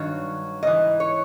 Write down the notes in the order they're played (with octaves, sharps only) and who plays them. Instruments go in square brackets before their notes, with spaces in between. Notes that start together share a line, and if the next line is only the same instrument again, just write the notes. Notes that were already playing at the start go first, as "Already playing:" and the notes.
Already playing: [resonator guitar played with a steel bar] G2 D#3 F#3 C#5
G#2 E3 D#5
C#5